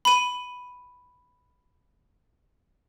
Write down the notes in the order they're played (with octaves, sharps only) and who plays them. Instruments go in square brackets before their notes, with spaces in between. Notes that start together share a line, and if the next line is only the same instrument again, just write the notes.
[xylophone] B5 D#7